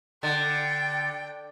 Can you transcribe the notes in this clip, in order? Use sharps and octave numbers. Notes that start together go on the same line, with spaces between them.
D3 G5 A6